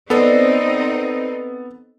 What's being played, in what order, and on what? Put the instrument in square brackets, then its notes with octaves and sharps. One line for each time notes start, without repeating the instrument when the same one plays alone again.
[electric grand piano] B3 A4 [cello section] C4 D#4 [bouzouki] C5 D5 D#5